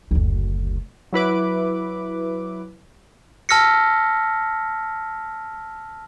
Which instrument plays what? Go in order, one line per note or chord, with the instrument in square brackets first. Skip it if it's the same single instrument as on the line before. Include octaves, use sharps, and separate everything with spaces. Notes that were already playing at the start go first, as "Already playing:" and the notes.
[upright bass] F#1 D2
[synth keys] F#3 E4 B4 D6
[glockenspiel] A5 E6 F6 A#6 B6 C#7